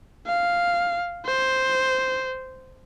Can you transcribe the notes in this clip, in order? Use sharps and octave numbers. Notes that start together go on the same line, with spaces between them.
F5
C5